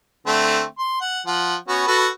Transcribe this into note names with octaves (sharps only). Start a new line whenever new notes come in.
D3 A3 C4
C6
F#5
F3 F#5
B3 C#4 F#4
F#4 A4 B4